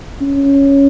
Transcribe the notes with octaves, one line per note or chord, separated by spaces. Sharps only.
C#4